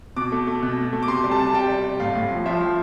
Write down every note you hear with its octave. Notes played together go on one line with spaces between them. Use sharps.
B2 D6
A3
A3
B2
B2
A3
D6
C3 C6
G3
A5
C3
A5
G3 G5
G3
G3
A2 F5
A2
F3
F3 E5
F3